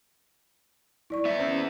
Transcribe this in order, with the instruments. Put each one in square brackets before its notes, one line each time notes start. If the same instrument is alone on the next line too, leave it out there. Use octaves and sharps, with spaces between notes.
[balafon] E4 D5 C#6
[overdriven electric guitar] B3 E5
[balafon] C#4 C5